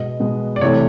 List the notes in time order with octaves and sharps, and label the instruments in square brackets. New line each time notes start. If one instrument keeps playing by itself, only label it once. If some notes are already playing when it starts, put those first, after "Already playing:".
Already playing: [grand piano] B2 G#3 B3 D#5
B2 G#3 B3
D5
C3 E3 A3 C#5